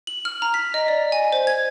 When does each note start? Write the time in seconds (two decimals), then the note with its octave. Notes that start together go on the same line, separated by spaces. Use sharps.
0.07 F#7
0.25 F6
0.42 A#5
0.54 B6
0.74 D#5
0.88 D5
1.12 G#5
1.32 C5
1.47 G#6